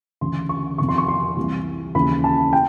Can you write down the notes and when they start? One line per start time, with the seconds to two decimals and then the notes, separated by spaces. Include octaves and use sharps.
0.21 D2 C#3 E3 C6
0.49 C#6
0.78 F2 C3 D#3 C#6
0.89 C6
0.98 C#6
1.08 C6
1.36 C2 C3 E3
1.94 D#2 C#3 E3 B5
2.24 A5
2.53 G5